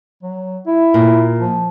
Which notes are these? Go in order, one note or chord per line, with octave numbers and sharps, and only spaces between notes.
F#3
E4
A#2
F3